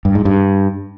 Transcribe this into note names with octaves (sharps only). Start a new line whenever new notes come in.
G2
G#2
G2